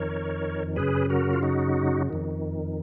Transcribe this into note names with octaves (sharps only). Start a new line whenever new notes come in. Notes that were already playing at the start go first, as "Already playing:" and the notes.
Already playing: F2 D#3 A#4 C#5
F#2 C#3 G#4 B4
F#4 A#4
F4
D#4 F#4
F2 D#3